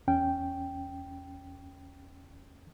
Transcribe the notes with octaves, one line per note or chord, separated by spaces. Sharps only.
E2 C#4 G5